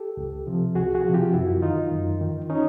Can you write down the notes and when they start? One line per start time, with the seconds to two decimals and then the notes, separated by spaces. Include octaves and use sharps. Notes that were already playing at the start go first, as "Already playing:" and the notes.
Already playing: G4 A4
0.17 C#2
0.47 C3 F3
0.75 C#2 F#4 G#4
0.95 F#4 G#4
1.05 C3 F3
1.14 F4 G4
1.34 F#2 E4 F#4
1.62 D#3 D#4 F4
1.92 F#2
2.21 D#3
2.50 C#4 D#4